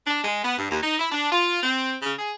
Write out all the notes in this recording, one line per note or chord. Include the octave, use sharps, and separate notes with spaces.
D4
G#3
B3
G2
D#2
D#4
E4
D4
F4
C4
C#3
G#4